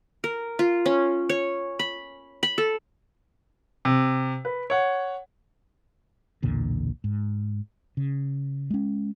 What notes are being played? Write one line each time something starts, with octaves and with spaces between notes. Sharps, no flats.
A#4
F4
C#4
C#5
B5
B5
A4
C3
B4
C#5 F#5
B1 E2 A#2 D3
G#2
C#3
G#3 C#4